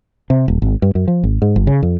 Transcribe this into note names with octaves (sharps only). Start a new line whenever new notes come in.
C3
D#1
G#1
G2
F#2
F3
G#1
G#2
G1
C#3
F2